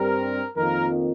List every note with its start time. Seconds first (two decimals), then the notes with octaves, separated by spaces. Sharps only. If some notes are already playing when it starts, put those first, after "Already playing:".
Already playing: G2 G3 C4 A#4
0.57 F2 D#3 A#3 A#4